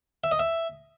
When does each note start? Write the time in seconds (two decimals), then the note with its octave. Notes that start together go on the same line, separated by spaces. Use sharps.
0.24 E5
0.31 D#5
0.39 E5